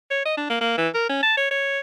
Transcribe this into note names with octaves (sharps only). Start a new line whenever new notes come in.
C#5
D#5
D4
A#3
A#3
E3
A#4
C#4
A5
C#5
C#5